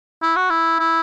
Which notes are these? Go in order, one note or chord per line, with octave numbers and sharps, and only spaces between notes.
E4
F#4
E4
E4